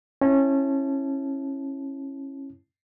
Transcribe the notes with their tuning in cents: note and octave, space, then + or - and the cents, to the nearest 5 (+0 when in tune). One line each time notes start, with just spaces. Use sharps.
C#4 -25 E4 +0 A5 -20